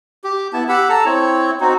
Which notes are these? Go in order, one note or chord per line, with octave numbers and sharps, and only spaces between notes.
G4
B3 E4 A5
G4 F#5 B5 E6
A4 A5 A#5 E6
C4 E4 C#5
C4 D#4 F#4